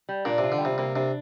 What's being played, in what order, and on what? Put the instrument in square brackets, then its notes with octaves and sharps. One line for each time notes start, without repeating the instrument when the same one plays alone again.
[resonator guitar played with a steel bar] G3
[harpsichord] A#2 [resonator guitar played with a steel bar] D4
[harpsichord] C3
[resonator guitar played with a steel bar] F4
[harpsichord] D3
[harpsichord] C3 [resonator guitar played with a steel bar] G3
[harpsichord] C3 [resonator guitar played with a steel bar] A#3
[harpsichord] C3 [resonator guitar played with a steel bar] D4